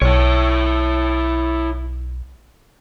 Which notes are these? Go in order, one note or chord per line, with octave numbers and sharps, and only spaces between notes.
B1 E4 C#5